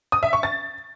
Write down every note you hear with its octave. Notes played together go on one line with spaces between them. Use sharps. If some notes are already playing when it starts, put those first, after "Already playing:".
D#6
E5
C#6
A6